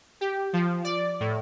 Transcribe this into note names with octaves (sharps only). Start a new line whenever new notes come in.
G4
F3
D5
A2